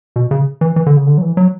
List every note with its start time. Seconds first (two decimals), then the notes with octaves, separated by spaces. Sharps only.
0.16 B2
0.31 C#3
0.61 E3
0.76 E3
0.86 D3
0.97 C#3
1.07 D3
1.18 F#3
1.22 E3
1.37 F#3